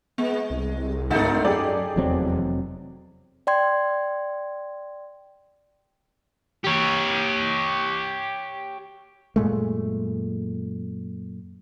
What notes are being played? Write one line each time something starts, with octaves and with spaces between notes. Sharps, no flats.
G#3 B3
C2
G#1 D2 D#4 A4
F#2 G4 G#4 D5
F1 E2 F#3 C4
D5 G5 C6 G#6
G4 C#5
F#2 A#2 G#3 A3